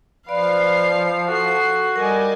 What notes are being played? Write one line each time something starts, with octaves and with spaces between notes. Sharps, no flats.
F3 B4 D5 F5 C7
F#4 A4 C7
G3 A#4 D5 D#5 G#5